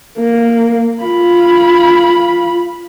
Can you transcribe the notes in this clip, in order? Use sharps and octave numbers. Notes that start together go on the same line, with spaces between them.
A#3
F4 B5